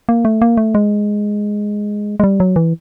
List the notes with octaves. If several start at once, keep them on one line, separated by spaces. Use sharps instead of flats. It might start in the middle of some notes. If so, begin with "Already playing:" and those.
A#3
A3
A#3
A3
G#3
G#3
G3
F#3
E3